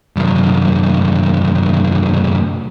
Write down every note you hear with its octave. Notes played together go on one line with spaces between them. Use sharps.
C2 F#2